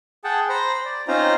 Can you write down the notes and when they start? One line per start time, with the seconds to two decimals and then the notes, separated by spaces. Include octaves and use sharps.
0.24 G#4 F#5 G5 A5
0.49 C5 A#5 B5
0.85 D5
1.08 C4 C#4 D#4 F4 C5 A#5